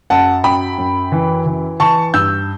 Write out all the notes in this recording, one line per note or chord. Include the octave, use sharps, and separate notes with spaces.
F#2 F#5 A5
F#2 G5 B5
F#2
E3
E3
E3 A5 C#6
G2 E6 G6